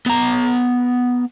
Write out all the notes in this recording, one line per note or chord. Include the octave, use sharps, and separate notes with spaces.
B3 A#5